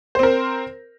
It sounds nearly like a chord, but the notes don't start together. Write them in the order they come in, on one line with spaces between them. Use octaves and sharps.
C5 C4 A#4